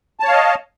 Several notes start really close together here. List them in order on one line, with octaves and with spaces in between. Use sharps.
A5 C#5 F5 D#5